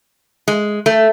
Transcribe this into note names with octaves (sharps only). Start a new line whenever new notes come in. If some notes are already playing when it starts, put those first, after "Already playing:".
G#3
A3